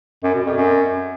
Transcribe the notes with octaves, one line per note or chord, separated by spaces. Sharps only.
F#2
B2
F2
F#2